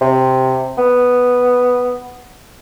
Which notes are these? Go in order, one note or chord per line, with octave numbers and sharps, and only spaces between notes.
C3
B3